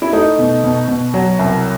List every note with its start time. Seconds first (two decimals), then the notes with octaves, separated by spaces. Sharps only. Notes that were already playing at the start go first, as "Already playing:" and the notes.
0.02 E4
0.13 A3 D#4
0.39 B2
0.63 B2
0.88 B2
1.14 F#3
1.39 C2